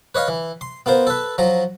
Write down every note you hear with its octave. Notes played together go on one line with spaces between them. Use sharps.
B4 C#5 D#5 F5
E3
C6
B3 F4 A#4 C5
A4 B4
F3 F#3 A#5